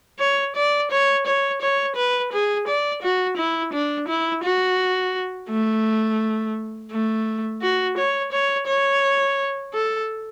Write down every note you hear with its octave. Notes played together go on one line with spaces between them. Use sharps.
C#5
D5
C#5
C#5
C#5
B4
G#4
D5
F#4
E4
D4
E4
F#4
A3
A3
F#4
C#5
C#5
C#5
A4